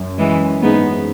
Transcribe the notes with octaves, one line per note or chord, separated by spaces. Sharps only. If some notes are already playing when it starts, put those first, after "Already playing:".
Already playing: F#2
E3 G#3
G#2 B3 D#4